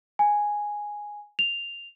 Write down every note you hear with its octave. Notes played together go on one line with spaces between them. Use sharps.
G#5
F7